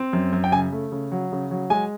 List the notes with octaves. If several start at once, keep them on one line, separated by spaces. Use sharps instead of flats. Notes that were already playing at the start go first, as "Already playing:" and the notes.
Already playing: C4
F#2
F#2
G5
C#3 G#5
A3
C#3
F#3
C#3
F#3
G#3 G#5